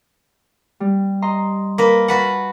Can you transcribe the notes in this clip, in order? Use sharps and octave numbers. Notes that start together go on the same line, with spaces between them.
G3
D#5 A#5 C6
A#3 A#4 B4
F#4 B4 F#5 A5